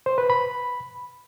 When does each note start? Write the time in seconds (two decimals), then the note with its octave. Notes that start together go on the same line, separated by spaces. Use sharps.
0.06 C5
0.18 B4
0.30 B5